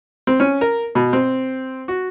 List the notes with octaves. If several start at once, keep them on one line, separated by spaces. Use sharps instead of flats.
C4
C#4
A#4
B2
C4
F#4